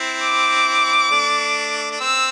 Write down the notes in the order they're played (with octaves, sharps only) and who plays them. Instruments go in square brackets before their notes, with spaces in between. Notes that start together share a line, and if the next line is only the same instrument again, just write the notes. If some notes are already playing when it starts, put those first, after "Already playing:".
Already playing: [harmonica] C4 E4
[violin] D6
[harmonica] A3 D4
D4
[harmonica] C4 [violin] E6